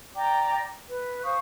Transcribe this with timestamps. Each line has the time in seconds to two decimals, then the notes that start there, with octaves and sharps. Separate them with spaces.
0.15 D5 G5 A#5 D6
0.89 B4
1.24 C5 F5 C#6 D#6